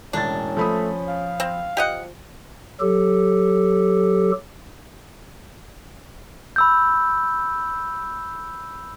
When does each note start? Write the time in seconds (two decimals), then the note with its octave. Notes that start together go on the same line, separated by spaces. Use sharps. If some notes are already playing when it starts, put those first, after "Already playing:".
0.13 E1 A2 C#4 D4 A6
0.57 F3 A3 B5 D#6
1.08 F5
1.40 C4
1.77 F3 G4 D#5 F#5
2.80 F#3 G4 A4
6.56 B5 E6 G6